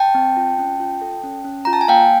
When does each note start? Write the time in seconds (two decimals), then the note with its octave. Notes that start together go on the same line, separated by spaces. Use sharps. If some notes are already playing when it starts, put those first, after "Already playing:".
Already playing: G5 A5
0.15 C4
0.37 F4
0.59 C#4
0.80 F4
1.01 A4
1.23 C#4
1.44 C#4
1.65 F4 A#5
1.73 A5
1.81 G#5
1.88 A#3 F5 G5